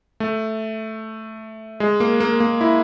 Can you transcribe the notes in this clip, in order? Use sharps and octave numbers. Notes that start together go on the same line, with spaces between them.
A3
G#3
A#3
A#3
A#3
E4